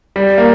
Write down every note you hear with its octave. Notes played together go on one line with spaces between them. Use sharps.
G3
A#3